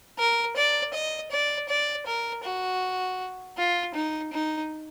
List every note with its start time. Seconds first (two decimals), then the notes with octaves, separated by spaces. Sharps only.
0.18 A#4
0.56 D5
0.93 D#5
1.31 D5
1.68 D5
2.06 A#4
2.43 F#4
3.57 F4
3.94 D#4
4.33 D#4